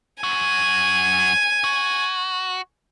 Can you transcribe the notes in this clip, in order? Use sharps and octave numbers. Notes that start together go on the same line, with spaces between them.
F#2 F#4 G#5
F#4